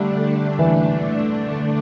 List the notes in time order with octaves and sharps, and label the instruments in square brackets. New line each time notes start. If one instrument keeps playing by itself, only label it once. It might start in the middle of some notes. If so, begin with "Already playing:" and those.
Already playing: [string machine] D3 A3 D4 [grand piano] G3
[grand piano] E3